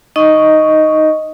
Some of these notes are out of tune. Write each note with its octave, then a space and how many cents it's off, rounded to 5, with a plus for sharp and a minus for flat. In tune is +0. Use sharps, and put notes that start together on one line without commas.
D#4 +0 D#5 +0 C#6 +5